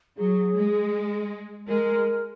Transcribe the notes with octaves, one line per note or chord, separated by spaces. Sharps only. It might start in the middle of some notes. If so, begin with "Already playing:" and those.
F#3 G#4
G#3
G#3 A#4